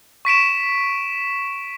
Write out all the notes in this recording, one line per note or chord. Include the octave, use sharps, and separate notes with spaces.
C#6 B6 D7 E7